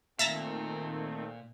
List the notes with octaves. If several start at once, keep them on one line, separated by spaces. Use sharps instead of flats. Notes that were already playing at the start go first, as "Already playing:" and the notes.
A#2 D#3 A3 C4 E5 A5 A#5